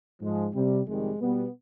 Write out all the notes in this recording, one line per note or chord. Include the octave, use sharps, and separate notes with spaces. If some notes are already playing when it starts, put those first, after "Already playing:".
G#2 F3 G#3
C3 G3
F2 C3 D#3 G3 G#3
B2 G3 B3